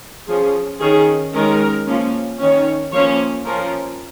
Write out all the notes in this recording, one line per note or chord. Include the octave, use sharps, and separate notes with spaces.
F3 C#4 G#4
D#3 C#4 G#4
D#3 G#3 C#4 A#4
F3 A#3 C#4
D#3 C#4 C#5
F3 A#3 C#4 C#5
F3 C#4 A#4